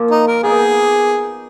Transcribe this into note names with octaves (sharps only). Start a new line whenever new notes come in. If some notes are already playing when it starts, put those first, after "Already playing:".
Already playing: A#2 F3 A#3
D#4
A#4
B2 A#3 D#4 G#4